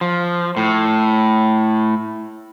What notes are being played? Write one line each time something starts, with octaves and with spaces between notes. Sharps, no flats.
F3
A2